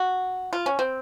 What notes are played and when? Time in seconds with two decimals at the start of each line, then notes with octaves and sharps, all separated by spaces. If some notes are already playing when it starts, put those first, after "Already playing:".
Already playing: F#4
0.53 F4
0.66 C#4
0.79 C4